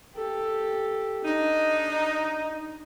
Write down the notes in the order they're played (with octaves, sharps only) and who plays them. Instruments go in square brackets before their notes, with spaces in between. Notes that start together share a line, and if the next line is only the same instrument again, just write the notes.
[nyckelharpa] G4 A4
[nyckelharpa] D4 [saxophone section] D#4